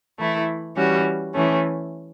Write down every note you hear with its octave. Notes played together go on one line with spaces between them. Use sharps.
E3 A3 E4
E3 G3 C#4 F#4
E3 A3 C#4